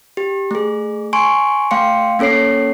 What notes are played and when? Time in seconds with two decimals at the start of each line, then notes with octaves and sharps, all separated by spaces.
0.17 G4
0.51 A3 G#4
1.13 G#5 C6 C#6 D7
1.71 A3 F5 G5 C6 C#7
2.19 A#3 C#4 A4 C#5 C7